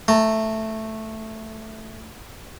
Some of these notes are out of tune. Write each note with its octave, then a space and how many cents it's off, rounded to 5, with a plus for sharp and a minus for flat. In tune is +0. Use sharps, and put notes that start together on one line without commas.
A3 +0 A#5 -25